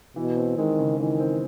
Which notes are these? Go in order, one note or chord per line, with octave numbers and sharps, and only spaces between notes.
B2 E3
C4
D#3 G#3
C#3
D#3 E3
C4